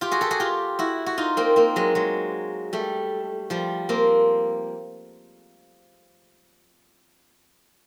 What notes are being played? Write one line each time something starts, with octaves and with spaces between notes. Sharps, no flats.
F4 G4
F#4 G#4
G4 A4
F#4 G#4
F4 G4
E4 F#4
F#4
D#4 F4
A#3 C4
A#3 C4
F#3 G#3
F#3 G#3
G3 A3
F3 G3
A#3 C4